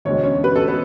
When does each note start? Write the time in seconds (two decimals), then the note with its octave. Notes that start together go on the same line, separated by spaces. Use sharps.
0.05 E1 D2 D3 G#3 C#5
0.23 C#4 C#5
0.44 B4
0.56 A4
0.68 B3 B4